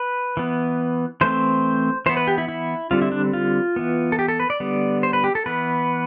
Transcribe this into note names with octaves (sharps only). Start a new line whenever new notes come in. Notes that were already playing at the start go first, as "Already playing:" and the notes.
Already playing: B4
E3 B3
E3 A3 C4 C5
E3 B3 C5
B4
G4
E4
E4
D3 G3 C4 F4
E4
D4
F4
E3 B3
A4
G4
A4
B4
D5
D3 G3 B3
C5
B4
G4
A4
E3 B3 B4